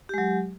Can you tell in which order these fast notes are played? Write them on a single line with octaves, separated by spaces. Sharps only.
G4 G#3 F#3